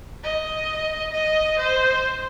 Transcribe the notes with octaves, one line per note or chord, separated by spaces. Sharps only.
D#5
D#5
C5